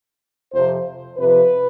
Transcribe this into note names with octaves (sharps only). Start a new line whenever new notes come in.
F2 C3 F3 C5
F2 C3 F3 B4